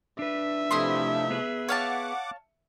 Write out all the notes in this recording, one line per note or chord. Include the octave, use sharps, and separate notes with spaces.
D4 B4 E5
C3 F3 A3 E4 D#5 C6
B3 G#4 B4
C#5 F5 F#5 A5 D6